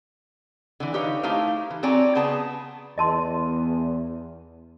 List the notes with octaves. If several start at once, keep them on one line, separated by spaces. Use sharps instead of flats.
D3 E3
D#4 G4 B4 C#5 F5
A3 D#4 E4 G4 C5 F5
E3
C4 F#4 C#5 D5 G#5 A#5
C#3 B3 G#4 A5
E2 D#5 A5 C6